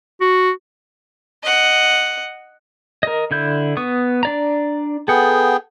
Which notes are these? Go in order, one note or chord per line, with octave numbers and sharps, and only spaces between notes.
F#4
D#5 F#5
A#4 D#5
D3 E4 G6
B3 C#6 D#6
D4 D5 A#5
B3 G#4 A4 F#5 G5